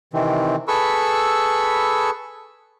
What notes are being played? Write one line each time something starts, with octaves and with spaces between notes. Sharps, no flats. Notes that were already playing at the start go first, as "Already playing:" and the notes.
C3 D#3 E3 C4
G#4 A4 B4 B5 C#6 E6